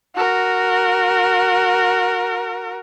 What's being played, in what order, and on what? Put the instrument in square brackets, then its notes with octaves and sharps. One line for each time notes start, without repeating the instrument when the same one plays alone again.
[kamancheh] F#4 A#4